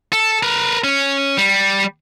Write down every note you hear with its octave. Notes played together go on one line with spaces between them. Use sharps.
A4
A#4 B4
C#4
G3